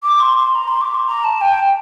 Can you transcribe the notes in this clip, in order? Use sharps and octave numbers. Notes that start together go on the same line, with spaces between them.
D6
C6
C6
A#5
C6
D6
C6
A#5
A5
G5